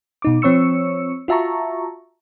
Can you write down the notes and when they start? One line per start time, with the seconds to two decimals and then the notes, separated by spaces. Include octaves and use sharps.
0.22 B2 D#4 D6
0.42 F3 C4 C#5 C#6 E6 C#7
1.28 F4 F#4 E5 A5 A#5 C#6